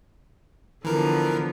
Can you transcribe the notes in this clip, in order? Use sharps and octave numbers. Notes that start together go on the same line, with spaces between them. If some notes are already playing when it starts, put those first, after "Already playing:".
D3 E3 F3 B3 A#4